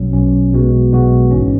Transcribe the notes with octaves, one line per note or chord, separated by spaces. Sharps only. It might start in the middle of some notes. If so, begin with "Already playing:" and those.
Already playing: B1 B2 F#3 C#4
B1 B2 F#3 C#4
B1 B2 G#3 B3 F#4
B1 B2 G#3 B3 F#4
G#1 G#2 E3 C#4